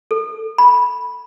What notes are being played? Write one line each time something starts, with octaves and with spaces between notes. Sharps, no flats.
A4
B5